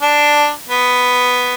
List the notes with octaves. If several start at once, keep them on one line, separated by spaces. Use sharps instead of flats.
D4
B3